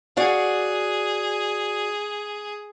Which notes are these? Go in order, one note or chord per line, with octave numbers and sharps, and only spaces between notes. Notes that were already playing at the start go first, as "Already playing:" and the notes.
F#4 G#4 D5 F5